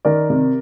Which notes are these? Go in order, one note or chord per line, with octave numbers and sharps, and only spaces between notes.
D#3 A#4 D5
C3